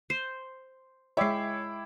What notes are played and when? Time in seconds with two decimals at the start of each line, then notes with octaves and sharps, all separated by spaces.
0.10 C5
1.17 G#3 E4 C#5 E5 G5 D6 C7